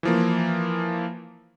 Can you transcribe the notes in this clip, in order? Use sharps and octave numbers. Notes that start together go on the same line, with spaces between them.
E3 F3 A#3